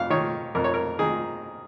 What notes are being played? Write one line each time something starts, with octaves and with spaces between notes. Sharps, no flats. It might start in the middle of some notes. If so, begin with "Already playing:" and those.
Already playing: F2 F5
D#3 C#5
F2 A#4
C#5
A#4
D#3 G#4